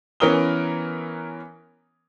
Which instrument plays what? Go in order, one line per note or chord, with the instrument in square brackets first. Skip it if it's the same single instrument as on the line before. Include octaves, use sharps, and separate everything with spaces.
[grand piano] E3 B3 C#4 A#4 D#6 G7